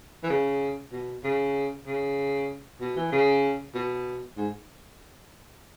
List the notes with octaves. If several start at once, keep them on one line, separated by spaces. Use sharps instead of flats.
E3
C#3
B2
C#3
C#3
B2
E3
C#3
B2
G#2